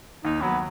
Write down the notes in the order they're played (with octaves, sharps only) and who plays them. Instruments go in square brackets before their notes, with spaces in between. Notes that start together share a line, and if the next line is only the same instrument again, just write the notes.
[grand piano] D#2 [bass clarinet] D#4
[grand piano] F#3 [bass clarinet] B3